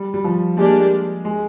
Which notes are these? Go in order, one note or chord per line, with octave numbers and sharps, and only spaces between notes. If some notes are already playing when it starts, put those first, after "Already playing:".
Already playing: G3
G3
F3
G#3 A#3 D4 G4 D5
G#3